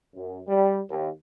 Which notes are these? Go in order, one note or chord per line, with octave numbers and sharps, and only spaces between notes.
F#2
G3
D#2